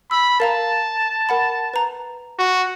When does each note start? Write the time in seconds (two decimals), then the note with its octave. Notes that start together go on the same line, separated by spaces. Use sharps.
0.11 B5 E6
0.40 A#4 F5 A5 A#5
1.29 A#4 F#5 B5
1.74 B4 A#5
2.39 F#4